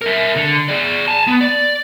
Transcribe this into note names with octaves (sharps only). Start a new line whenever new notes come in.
A#4 E5
D3
G#4 D5
G#5 A5
B3
D5